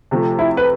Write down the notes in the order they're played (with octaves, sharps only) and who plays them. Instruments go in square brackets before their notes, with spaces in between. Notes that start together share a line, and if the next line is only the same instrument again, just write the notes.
[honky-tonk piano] C3 F3 A3
[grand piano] E4
B4